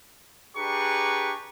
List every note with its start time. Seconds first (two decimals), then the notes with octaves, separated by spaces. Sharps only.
0.57 D4 G4 G#4 B4 A#5 C#6